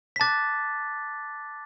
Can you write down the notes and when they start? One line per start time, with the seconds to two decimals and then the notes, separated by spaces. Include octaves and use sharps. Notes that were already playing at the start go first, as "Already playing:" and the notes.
0.16 B6
0.20 A5 D6 F#6 A6